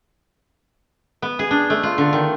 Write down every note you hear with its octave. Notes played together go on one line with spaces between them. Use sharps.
B3
G#4
D4
A3
F4
D3
D#3